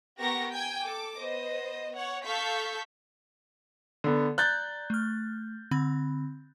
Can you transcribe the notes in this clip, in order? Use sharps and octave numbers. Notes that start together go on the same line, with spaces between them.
B3 G4 A#4 F#5 C#6 A#6
G5 G#5 G#6
A4 D6
B3 C5 D#5
C#5 F#5
A4 F5 C#6 G6 B6
D3 B3
D5 A#5 F#6 G6 A6
A3 F6
D3 C4 B5